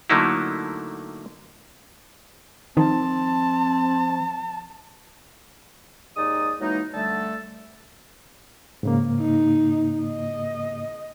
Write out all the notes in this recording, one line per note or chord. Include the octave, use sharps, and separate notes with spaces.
D3 F#3 A3 A#3 D#4 E4
D#3 F3 C4 A5
D#2 G#3 D#4 D5 D#6
E3 F#3 G#3 A#3 D#4
D3 G3 A3 A4
G#2 C#3 A#3
D#4
D#5